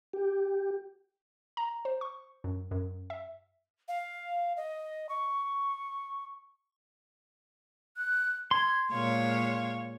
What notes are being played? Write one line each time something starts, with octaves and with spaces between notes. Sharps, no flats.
G4
A#5
C5
C#6
F#2
F#2
E5
F5
D#5
C#6
F#6
C6 G#6
A#2 G#3 C#5 F5